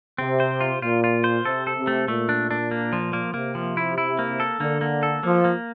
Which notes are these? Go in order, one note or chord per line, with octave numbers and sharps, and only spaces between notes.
C3 C4
C5
F4
A#2 F4
F4
C5
C3 A4
A4
C3
A3
A#2 A3
D4
D4
A#3
F3
A#3
C3 A#3
F3
E4
E4
A#3
A4
D3 A#3
A#3
A4
F3 A#3
A#3